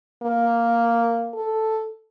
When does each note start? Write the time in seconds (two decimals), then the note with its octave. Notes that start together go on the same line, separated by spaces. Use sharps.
0.23 A#3
1.34 A4